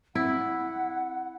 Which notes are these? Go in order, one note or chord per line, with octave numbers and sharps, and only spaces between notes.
C4 E4 F#5